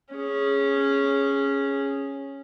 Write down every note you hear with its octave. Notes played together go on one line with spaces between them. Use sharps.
C#4 G#4